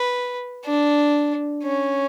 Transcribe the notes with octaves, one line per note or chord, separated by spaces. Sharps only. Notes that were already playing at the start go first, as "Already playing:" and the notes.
Already playing: B4
D4
C#4